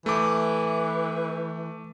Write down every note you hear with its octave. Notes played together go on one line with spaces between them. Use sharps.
E3 A3 D6